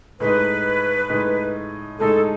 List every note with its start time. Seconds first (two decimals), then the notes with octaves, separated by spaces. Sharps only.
0.20 A2 G#3 D#4 B4
1.10 A2 G#3 D#4
1.99 A2 G#3 D#4 A4